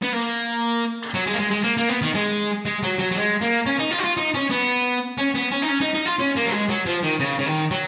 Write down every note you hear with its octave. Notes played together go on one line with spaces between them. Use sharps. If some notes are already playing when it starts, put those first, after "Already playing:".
B3
A#3
F#3
G#3
A#3
G#3
G#3
A#3
A#3
B3
D#3
G#3
G#3
F#3
F#3
F#3
G#3
A#3
C#4
D#4
F4
F#4
F4
D#4
C#4
B3
C#4
B3
C#4
D#4
C#4
D#4
D#4
F4
C#4
A#3
F#3
G#3
F#3
F3
D#3
C#3
C#3
D#3
F#3